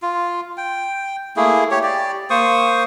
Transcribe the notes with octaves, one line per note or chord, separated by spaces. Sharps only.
F4
G5
A3 A#3 E4 G#4
G4 C#5
G4 D5
A#3 C5 C#6 D#6